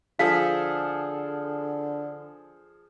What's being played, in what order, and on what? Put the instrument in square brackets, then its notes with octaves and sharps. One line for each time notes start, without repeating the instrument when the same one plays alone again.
[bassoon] D3 [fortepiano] F3 G#4 A4 [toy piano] F5